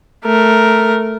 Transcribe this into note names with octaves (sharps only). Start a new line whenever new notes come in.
A3 A#4